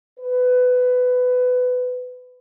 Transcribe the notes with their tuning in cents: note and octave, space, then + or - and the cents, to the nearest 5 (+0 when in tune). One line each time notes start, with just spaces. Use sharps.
B4 +20